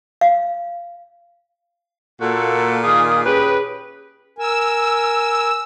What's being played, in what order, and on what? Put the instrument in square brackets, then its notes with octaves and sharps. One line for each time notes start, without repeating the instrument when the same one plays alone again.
[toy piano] F5
[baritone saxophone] A#2 [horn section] A#3 F#4 A4
[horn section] D#3 F4 G#4 [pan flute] D#6
[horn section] C#4 G4 B4 [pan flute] G#4
[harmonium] A#4 G#5 [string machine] E6